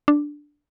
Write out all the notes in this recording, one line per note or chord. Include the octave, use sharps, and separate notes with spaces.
D4